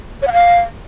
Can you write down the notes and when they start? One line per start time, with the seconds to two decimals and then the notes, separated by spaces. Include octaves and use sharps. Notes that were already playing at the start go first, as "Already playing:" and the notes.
0.22 C#5
0.27 F#5
0.33 F5